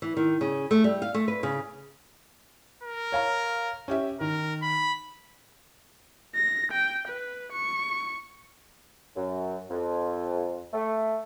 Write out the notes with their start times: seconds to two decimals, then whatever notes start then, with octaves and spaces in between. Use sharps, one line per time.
0.02 E3
0.17 D#3
0.41 C#3
0.71 A3
0.84 G3
1.02 F5
1.14 A3
1.28 B4
1.43 C#3
2.84 A#4
3.12 C#5 F5 A#5
3.88 C#4 G4 E5
4.21 D#3 A#4
4.63 B5
6.35 A#6
6.72 G5
7.08 B4
7.52 C#6
9.15 F#2
9.70 F2
10.74 A3